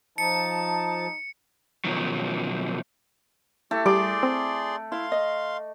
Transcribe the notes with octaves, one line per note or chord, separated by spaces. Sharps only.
F3 D#4 A5 C#7
B2 D#3 F3 F#3
A3 E4 G4
G3 G#4 D5 C6 D6
C4
E4 F5 C6
D#5